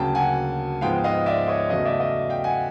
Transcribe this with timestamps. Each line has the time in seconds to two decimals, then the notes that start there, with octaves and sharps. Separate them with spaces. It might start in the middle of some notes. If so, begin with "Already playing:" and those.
Already playing: D2 C#3 F#3 A#3 G5 A5
0.15 F#5 G#5
0.81 G#2 F3 G#3 B3 F5 G5
1.04 D#5 F5
1.26 D5 E5
1.48 C#5 D#5
1.70 E2 C#3 F#3 A3 D#5 F5
1.85 D5 E5
2.00 D#5 F5
2.29 F5 G5
2.44 F#5 G#5